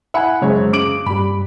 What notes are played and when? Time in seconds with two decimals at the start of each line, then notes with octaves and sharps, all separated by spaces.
0.14 E4 E5 F#5 G#5 B5
0.42 F#2 C#3 G#3 C5 C#5
0.73 C#3 D6 D7 F#7
1.06 G2 G3 B5